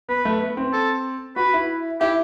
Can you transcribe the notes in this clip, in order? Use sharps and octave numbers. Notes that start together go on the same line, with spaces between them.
B3 B4
A3
B3
C4
A4
F#4 B4
E4
E4 G4